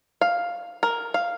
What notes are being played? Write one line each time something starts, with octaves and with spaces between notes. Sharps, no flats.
F5
A#4
F5